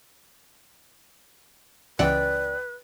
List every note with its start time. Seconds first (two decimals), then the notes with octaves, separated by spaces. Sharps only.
1.99 C#2 E3 B4 D5 F#5 G5